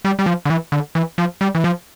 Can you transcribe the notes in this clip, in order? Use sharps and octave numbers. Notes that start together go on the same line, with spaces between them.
G3
G3
F3
D3
E3
D3
E3
F3
G3
E3
F3